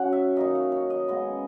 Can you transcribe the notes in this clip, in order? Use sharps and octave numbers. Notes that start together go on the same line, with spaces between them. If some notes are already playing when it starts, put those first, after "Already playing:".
Already playing: F#3 C#4 F#5
E5
D#3 A#3 D#4 D#5
C#5
C#5
D#5
C#3 G#3 B3 D#5